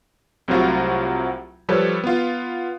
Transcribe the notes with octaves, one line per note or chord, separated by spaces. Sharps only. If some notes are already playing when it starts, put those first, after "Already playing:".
C2 C3 F#3 A3 F4 F#4
F3 G3 A4 B4 C#5
B3 F4